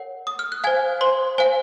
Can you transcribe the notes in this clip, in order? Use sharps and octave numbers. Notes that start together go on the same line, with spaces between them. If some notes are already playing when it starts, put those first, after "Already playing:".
Already playing: A#4 C#5 F#5
D#6
F6
F#6
C5 F5 G#5 G#6
C5 C6
C5 F5 G#5